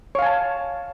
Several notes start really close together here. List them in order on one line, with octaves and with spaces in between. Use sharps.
C#5 F5 G#5 A5